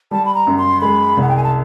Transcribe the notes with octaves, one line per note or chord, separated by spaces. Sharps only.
G3 A5
B5
A#5
F#2
C6
G#3 B5
C2 F#5
G5
G#5
A5